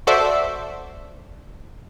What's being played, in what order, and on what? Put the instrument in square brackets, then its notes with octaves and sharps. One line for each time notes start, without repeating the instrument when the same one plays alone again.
[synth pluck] F#4 A4 C5 D5 E5